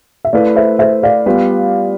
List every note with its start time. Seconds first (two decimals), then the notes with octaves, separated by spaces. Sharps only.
0.25 E5
0.33 A3 E4 B4 D5 F5
0.56 C5 E5
0.79 C5 E5
1.03 D5 F5
1.26 G3 B3 F4 B4